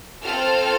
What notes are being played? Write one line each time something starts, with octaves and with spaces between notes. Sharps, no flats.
C4 F4 A4 F6